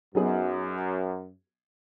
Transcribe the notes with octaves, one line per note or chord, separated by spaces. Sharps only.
F#2 F#3 B3 D#4 G#4